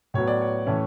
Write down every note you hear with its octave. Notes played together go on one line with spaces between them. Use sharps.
A2 F#3 B3 C#5
D5
C#5
A2 E3 A3 C#4